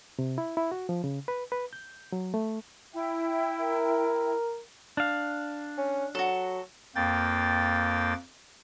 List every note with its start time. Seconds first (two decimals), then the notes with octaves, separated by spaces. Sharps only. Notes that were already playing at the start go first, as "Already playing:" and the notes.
0.19 C3
0.38 E4
0.57 E4
0.72 F#4
0.89 F3
1.04 C#3
1.28 B4
1.52 B4
1.73 G6
2.12 F#3
2.34 A3
2.94 E4 E5 G5
3.60 A#4
4.97 D4 F5
5.78 C#4
6.15 F#3 F#4 A4
6.95 F2 A#3 G5 A6